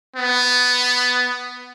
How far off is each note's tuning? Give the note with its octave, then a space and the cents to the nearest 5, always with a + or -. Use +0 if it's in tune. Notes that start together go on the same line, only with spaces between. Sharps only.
B3 +10